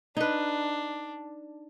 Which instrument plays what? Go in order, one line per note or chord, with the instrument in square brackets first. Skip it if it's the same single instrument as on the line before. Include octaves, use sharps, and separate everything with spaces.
[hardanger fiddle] D4 [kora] D#4 B4